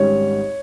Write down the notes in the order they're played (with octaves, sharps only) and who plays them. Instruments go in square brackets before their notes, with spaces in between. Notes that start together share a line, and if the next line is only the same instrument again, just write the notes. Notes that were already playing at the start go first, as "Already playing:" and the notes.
Already playing: [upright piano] G#1 G#2 G3 C#4 [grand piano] C#5